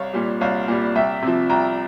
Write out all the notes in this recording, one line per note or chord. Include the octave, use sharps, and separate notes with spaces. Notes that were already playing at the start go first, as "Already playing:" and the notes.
Already playing: C2 C#5 F5
A#2 G3
C2 C#5 F5
A#2 G3
C2 E5 G5
C3 F3
C2 G5 A#5